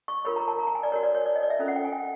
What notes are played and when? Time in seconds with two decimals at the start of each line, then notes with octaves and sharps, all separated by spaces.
0.08 C#6
0.25 F4 A#4 C#5 B5
0.36 A#5
0.48 A5
0.59 A#5
0.67 A5
0.75 G#5
0.83 D5
0.92 F#4 A#4 C#5
1.03 D5
1.15 C#5
1.26 D5
1.36 D#5
1.43 D5
1.50 E5
1.59 C#4 F4 A4 C5
1.68 F#5
1.76 G5
1.85 G#5
1.93 G5